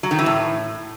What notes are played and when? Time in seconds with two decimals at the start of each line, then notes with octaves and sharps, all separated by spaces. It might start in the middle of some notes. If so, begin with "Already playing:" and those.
0.03 F#3
0.11 D#3
0.19 E3
0.26 A2